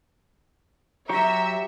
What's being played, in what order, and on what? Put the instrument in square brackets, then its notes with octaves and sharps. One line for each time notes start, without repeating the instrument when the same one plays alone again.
[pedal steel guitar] F#3 G4 C#5 [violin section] E5 [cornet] A#5